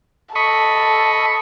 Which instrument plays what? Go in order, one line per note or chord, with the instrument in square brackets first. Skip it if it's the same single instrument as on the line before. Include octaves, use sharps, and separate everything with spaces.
[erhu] A4 [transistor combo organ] D#5 B5 C#6